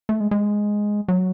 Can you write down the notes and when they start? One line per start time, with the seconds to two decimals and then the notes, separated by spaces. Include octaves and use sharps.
0.09 A3
0.20 G#3
0.31 G#3
1.08 F#3